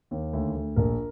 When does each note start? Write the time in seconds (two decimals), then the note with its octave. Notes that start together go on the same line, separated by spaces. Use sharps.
0.11 D#2
0.33 D2
0.55 D2
0.76 A#1 A#4